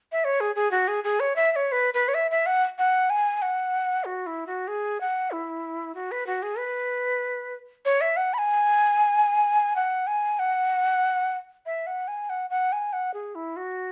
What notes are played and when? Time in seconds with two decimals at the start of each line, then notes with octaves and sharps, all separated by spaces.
0.12 E5
0.24 C#5
0.40 G#4
0.56 G#4
0.71 F#4
0.88 G#4
1.04 G#4
1.20 C#5
1.36 E5
1.52 E5
1.56 C#5
1.72 B4
1.94 B4
2.08 C#5
2.14 E5
2.31 E5
2.46 F#5
2.78 F#5
3.10 G#5
3.42 F#5
4.05 F#4
4.27 E4
4.47 F#4
4.68 G#4
5.01 F#5
5.31 E4
5.95 F#4
6.11 B4
6.27 F#4
6.43 G#4
6.58 B4
7.85 C#5
8.01 E5
8.17 F#5
8.34 B5
8.38 G#5
9.76 F#5
10.07 G#5
10.39 F#5
11.66 E5
11.87 F#5
12.08 G#5
12.30 F#5
12.50 F#5
12.72 G#5
12.93 F#5
13.14 G#4
13.35 E4
13.57 F#4